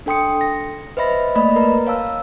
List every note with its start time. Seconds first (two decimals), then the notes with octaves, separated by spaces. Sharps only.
0.06 D4 A4 G5 C6 D#6 C#7
0.41 A#6
0.97 B4 C5 D#5 E5 B5 A#6
1.35 A3 A#3 D5 D#5 B5
1.56 A#4 B4 A#5
1.87 C#5 F5 A5 E6